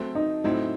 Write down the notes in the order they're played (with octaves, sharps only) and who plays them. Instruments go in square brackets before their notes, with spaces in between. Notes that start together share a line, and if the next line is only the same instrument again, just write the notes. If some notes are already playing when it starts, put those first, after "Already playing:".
Already playing: [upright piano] F#3 A3 C4
[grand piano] D#4
[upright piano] A2 F#3 C4 E4 [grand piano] D#4